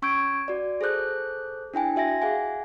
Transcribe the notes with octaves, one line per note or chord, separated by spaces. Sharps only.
C#4 C#6 E6 G6 G#6 D7
F#4 D5
G#4 A4 C5 F#6 G6
D4 E4 G5 G#5
F#4 E5 G#5 A#6
G#4 F5 F#5 G#5